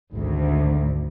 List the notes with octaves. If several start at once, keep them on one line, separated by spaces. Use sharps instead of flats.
G#1 D2